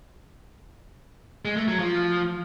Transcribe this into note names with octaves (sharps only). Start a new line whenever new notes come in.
G#3
A3
F#3
F3